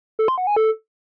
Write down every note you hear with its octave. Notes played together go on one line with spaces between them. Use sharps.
A4
C6
F#5
G#5
A4